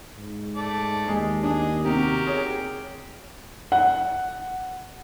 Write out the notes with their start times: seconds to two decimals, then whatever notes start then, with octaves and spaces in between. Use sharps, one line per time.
0.16 G#2
0.56 A3 D5 A5
1.08 D#2 G#3
1.43 D4 G#4 D#5
1.85 C3 F#4 G4 A#4
2.27 G#4 C#5
3.72 F#5